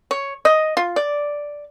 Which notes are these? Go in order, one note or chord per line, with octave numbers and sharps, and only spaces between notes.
C#5
D#5
F4
D5